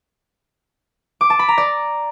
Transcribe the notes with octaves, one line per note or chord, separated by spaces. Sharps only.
D6
A5
B5
A#5
D5